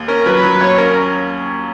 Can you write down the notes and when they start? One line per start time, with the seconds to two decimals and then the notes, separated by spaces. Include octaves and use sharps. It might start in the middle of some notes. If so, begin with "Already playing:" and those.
Already playing: D#2
0.08 C#4 A#4
0.26 F#3 B4
0.43 F#3
0.61 D#2 C#5
0.78 C#4 A#4